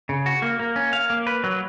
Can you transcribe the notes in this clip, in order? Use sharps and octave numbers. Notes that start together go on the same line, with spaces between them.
C#3
F#4
A#3
A#3
C#4
F5
A#3
B4
F#3